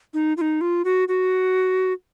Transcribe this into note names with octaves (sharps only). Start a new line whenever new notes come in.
D#4
F4
D#4
F4
F#4
F#4